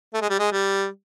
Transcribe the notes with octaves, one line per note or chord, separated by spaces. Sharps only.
A3
G#3
G3
G#3
G3